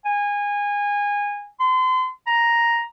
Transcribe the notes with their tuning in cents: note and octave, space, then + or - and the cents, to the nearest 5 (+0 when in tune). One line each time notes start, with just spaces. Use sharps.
G#5 -20
C6 -35
A#5 +5